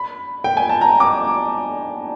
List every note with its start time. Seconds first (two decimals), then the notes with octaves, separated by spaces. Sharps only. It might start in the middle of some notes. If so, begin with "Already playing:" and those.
Already playing: B5
0.44 G5
0.57 G#5
0.69 A5
0.81 A#5
1.00 D6